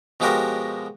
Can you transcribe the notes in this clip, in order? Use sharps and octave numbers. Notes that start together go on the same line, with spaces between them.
B2 F3 G#3 F#4 G4 A#4